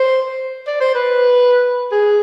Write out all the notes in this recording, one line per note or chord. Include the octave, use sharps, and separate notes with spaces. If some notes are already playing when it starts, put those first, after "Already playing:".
Already playing: C5
D5
C5
B4
G#4